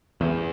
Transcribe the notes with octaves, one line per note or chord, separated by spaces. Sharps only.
E2